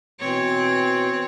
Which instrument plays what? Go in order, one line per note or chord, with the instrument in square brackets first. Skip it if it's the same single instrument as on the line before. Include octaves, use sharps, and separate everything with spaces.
[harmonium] B2 E3 [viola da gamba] C4 C#5